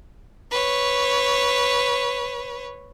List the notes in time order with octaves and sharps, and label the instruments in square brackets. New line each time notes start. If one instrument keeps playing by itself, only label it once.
[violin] B4 C#5